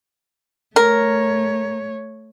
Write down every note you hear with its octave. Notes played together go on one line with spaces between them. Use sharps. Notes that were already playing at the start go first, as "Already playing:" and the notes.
A3 A#4 C#5